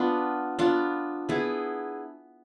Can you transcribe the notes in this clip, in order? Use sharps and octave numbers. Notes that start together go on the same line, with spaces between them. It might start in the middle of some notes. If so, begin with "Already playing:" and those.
Already playing: B3 D4 F4
B3 D4 F4
B3 E4 G#4